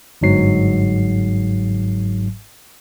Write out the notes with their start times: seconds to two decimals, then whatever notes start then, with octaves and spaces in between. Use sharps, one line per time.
0.21 G1 G#2 F#3 C7